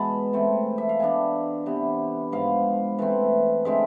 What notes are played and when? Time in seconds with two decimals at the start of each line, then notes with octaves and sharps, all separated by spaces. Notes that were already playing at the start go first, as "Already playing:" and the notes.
Already playing: B2 E3 G#3 B3 A5 B5
0.33 E3 A3 C4
0.78 E5
0.89 F5
1.00 E3 B3 D4 G#5
1.66 C3 E3 B3
2.32 G#2 F3 B3 F5
2.99 E3 A3 C4
3.65 D3 G#3 C4 E5